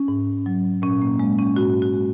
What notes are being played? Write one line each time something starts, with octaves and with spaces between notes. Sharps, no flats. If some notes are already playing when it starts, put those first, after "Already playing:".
Already playing: C#4
G#2
F#3
A#2 C#4
A#3
G#3
C#4
G#2 F#4
F#4
G#3